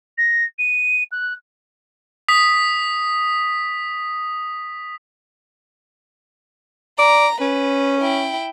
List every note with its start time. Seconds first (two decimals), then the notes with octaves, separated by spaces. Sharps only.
0.18 A#6
0.59 D#7
1.12 F#6
2.28 D#6 B6
6.99 D5 A#5
7.41 C#4 B4
8.01 E4 G5